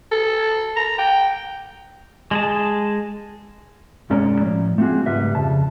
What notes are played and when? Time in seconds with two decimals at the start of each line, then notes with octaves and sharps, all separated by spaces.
0.12 A4
0.76 A#5
0.98 G5
2.31 G#3 G#4 A5
4.10 B1 F#2 G#3 C#4 D5 A#5
4.40 A2 F3
4.78 A3 C4 D4 F4 F#4 G#4
5.06 C#2 G#2 G3 B4 E5
5.35 F2 C#3 A5